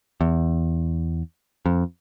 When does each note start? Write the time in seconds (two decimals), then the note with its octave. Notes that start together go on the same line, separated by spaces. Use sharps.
0.21 E2
1.66 F2